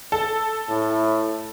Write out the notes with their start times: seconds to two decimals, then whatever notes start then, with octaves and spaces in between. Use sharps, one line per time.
0.12 A4
0.69 A2